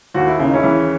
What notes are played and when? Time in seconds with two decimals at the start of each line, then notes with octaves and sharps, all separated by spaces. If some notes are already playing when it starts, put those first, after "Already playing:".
0.14 D#2 F#4
0.27 E4
0.39 C#3 D#4
0.54 C#4 E4
0.64 E3